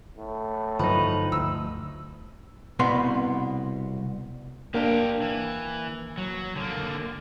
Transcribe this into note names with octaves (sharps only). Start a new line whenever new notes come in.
A2
G2 D3 F3 F#3 D#4 B4
D2 E6
C2 B2 B3 C6
A#3 D4 G4 A#4
E3
F#3
D3 A#3